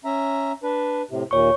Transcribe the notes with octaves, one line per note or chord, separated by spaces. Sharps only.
C#4 E5 A#5
D4 B4
A2 C3
D#2 A#2 C#5 C#6